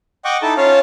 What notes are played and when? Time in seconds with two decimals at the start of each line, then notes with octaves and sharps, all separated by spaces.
0.25 D#5 F#5 G5 C#6 D6
0.42 D#4 E4 A4 A5
0.57 C#4 F4 C#5 F5 A5